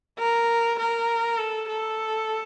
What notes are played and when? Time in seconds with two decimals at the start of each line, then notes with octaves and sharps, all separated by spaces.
0.18 A#4
0.78 A#4
1.38 A4
1.68 A4